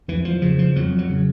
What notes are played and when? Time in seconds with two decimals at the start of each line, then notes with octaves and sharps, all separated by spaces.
0.08 F2 E3
0.25 F3
0.42 C#3 F3
0.59 F3
0.76 F2 F#3
0.98 F#3
1.10 C#3